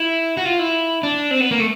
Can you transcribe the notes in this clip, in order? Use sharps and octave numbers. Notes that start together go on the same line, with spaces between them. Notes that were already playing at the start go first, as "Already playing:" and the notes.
Already playing: E4
F#4
F4
E4
D4
C4
B3
A#3
A3